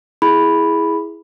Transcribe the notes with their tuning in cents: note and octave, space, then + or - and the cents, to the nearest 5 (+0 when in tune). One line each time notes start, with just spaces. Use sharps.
E4 +0 G#4 +0 B5 +0